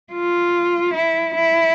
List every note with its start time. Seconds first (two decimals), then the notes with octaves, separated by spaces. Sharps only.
0.13 F4
0.94 E4
1.35 E4